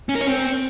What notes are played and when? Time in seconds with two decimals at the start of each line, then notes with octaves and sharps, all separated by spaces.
0.09 C#4
0.15 A#4
0.21 C#5
0.27 C4